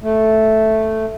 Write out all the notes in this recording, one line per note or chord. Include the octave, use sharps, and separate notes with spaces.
A3